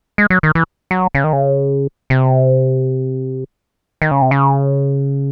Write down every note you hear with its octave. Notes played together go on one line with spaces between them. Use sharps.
G#3
F#3
D#3
E3
F#3
C#3
D#3
C#3
C3
D#3
C#3
C3
C#3